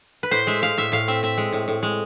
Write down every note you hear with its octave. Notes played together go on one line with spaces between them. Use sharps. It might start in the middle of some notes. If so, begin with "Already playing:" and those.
B4
A2 C5
G#3 E5
G#3 F5
A2 E5
A2 F5
C4 E5
C4 E5
G#3
A2
A2
G#3